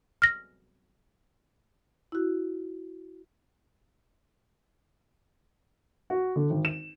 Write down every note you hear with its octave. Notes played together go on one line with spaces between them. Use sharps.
F6 A#6
E4 F#4
F#4
D3
G#1
E7